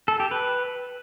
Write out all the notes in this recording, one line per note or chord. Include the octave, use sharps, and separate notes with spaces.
A4
G4
B4